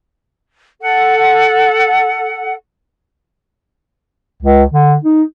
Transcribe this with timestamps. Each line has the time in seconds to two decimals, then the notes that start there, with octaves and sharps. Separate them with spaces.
0.81 A4 F#5
4.43 C#2
4.74 D3
5.04 D#4